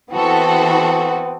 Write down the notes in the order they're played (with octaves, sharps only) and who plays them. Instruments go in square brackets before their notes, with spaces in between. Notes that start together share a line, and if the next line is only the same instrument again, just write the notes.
[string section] E3 F#4 A4 [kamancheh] B3 C4